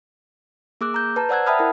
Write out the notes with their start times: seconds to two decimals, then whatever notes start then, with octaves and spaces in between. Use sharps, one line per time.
0.81 A#3 G#4 D6 E6 F#6
0.94 A#5 G6
1.16 B4 A5 A#5
1.29 C5 D5 F#5 E6 F#6 G#6
1.46 E5 G5 A5 B5 D#6 F6
1.58 E4 A#4 F#5